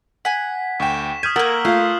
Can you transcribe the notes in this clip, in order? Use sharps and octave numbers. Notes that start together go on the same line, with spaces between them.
F#5 G#5 B6
D2 G5 C#6 E7
D#6 F6 G6 G#6 B6 D#7
A#3 B3 A#4 F#5 D#6 E6 F#7
A3 F4 F5 F#6 G6 C7